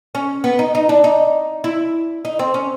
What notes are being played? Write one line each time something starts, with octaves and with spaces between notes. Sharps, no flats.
C#4
B3
D#4
D#4
D4
D#4
E4
D#4
C4
C#4